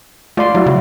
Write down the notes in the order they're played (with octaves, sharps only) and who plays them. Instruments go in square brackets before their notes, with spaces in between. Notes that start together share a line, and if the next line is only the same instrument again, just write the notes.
[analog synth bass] A3 [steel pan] F4 D5 C6
[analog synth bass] F#3 [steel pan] E4 F#4
[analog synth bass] C#3